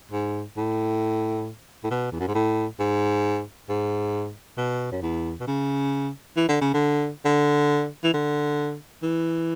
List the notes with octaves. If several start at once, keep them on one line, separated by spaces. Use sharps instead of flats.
G#2
A2
A2
B2
E2
F#2
G#2
A2
G#2
G#2
B2
F#2
E2
B2
C#3
E3
D3
C#3
D3
D3
E3
D3
E3